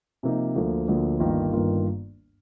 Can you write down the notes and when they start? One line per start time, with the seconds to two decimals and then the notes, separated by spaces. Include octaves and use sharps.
0.23 C3 F3 A#3 D#4
0.56 D2 D3 F3 A#3
0.88 D2 D3 F3 A#3
1.20 G1 G2 D#3 A#3 F4
1.53 G1 G2 D#3 A#3 F4